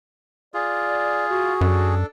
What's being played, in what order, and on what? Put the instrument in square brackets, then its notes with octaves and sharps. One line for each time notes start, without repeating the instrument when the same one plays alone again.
[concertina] F4 [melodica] G#4 [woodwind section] D5
[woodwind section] F#4
[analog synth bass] F#2 [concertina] D4 A4